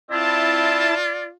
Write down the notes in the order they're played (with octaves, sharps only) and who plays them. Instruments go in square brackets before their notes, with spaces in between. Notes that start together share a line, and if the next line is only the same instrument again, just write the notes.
[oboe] C4 [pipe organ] E4 A5 [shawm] F4 [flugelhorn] D5